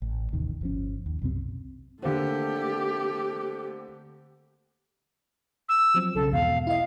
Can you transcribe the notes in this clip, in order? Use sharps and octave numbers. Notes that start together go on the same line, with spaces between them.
A1
A1 D#2 C3 D#3
G1 F3 C#4
D#2
B1 F#2 C3 C4
D3 A3 A#3 C4 G4
E6
F3 F#3 C4
B1 C#3 A4
E2 G#2 B2 F5
E4 D#5 F5